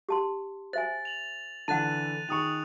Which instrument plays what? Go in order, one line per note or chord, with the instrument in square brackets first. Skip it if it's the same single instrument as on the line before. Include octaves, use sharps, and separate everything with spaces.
[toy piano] G4 A5 C6
[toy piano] C5 E5 G#5 [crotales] A6
[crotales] F7 F#7
[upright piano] D3 E3 [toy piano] F#5 A5 [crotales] F#6 A6 D#7
[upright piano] D#3 G#4 C#6 [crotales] D#6 F7